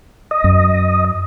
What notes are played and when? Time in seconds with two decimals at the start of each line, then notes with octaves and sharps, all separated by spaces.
0.31 D#5
0.44 F#2